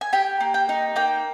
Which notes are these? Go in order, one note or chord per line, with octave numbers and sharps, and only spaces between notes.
G#5
G4 G5
A#3
G5
D#4
A#3 G5